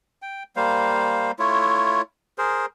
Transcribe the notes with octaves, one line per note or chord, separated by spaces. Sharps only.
G5
G3 A#3 C5 F5
A3 E4 F4 C#5
G#4 A#4 C5